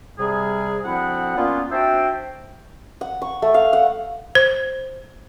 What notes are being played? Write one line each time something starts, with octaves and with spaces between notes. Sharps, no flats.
C3 G3 G#4
D2 F3 C4 E4 F#5
A#2 A#3 B3 C#4 F4
C4 D4 F#4 C5 E5 G5
F#5
C#6
A3
F5
F#5
C5